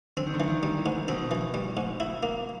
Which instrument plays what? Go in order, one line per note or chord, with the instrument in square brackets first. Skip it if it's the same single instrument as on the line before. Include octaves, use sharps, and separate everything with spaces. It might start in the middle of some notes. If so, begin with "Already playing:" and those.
[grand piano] D3 [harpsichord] C4
[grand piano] D#3
D3
[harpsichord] E3
[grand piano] D#3
[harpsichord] G3
[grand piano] E3
[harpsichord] G#2
[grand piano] B2 [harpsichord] C4
[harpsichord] E3
G3
G#2
E4
A#3